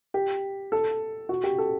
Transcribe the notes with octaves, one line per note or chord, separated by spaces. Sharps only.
G4
A4
F#4
G4
A4